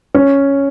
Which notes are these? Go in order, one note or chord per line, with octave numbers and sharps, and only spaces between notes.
C#4